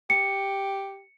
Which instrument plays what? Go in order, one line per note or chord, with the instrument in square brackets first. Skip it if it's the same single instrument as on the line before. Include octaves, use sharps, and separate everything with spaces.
[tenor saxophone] G4 [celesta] C#7